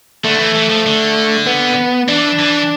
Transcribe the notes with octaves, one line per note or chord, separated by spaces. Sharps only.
D3 A3
E3
E3
F3
D3
B3
E3 D4
E3